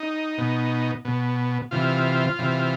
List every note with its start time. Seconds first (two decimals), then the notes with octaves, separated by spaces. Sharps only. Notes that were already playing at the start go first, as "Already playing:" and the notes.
Already playing: D#4
0.38 B2
1.05 B2
1.71 C3 E3 F4
2.39 C3 E3